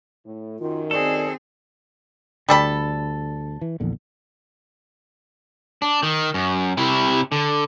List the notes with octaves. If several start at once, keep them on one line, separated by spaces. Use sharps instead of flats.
A2
F#2 D#3 F4
C4 G#4 A4 D5
D2 D3 G3 A4 B5
E3
A#1 E2 D3
D4
D#3
F#2
C3 E4
D3